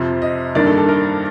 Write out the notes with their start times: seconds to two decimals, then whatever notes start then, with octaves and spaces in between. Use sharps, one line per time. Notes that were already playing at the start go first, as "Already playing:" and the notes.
Already playing: F2 C3 F3
0.22 D#5
0.55 G2 D#3 A#3 D4 D5
0.67 A4
0.78 A4
0.89 A#4